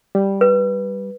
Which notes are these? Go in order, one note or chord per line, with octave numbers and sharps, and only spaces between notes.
G3
B4